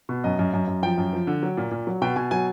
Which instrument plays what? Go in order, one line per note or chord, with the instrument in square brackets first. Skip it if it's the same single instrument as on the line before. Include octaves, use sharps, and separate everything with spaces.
[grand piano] B2
F#2 D#5
F#2
F#2
F#2
F3 G5
F#2
F3
D3
F#3
A#2
A#2
F#3
B2 G5
B2 G#5
F#3 G#5